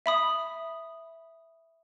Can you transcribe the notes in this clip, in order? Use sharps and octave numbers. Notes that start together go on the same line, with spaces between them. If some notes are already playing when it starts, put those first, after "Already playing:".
E5 B5 D#6